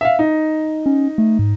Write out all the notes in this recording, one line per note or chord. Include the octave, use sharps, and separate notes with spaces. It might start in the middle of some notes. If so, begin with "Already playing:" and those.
E5 F5
D#4
C#4
A3
G#2